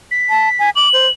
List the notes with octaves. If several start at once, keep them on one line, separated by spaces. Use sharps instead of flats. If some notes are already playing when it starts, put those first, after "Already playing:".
B6
A5
G#5
D6 F#7
C5